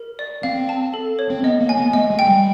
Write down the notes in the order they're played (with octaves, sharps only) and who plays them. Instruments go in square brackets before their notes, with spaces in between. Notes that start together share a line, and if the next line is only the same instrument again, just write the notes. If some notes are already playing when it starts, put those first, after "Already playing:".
Already playing: [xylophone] A#4
D5
[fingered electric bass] C4 [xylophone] F5
[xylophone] A5
A4
C#5
[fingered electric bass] C4
[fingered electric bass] B3 [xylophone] D#5
[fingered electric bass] A#3
[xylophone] G#5
[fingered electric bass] B3
[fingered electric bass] A3 [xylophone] D#5
[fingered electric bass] G#3
[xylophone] G5
[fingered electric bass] G3